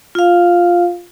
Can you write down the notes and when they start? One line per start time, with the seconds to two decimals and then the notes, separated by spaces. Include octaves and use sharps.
0.15 F4 F5